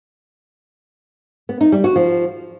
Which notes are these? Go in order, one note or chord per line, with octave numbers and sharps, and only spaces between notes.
B3
D#4
G3
F#4
F3